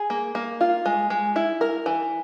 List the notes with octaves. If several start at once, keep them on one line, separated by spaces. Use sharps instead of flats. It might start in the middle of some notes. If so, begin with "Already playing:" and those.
Already playing: G#4
A#3
A#3
F4
G#3
G#3
E4
A#4
E3